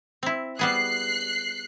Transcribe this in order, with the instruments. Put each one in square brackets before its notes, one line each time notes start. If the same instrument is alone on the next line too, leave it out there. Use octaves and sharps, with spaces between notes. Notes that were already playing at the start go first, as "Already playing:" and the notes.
[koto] C4 E4
[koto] G3 B3 G#4 [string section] F#6 C7